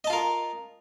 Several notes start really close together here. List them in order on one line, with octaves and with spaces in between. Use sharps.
D#5 A5 F4 A#4